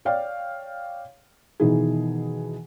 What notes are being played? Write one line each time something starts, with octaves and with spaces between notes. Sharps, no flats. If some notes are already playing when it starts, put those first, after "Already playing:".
C#5 D5 F5 G5
B2 D#3 E3 D#4 G#4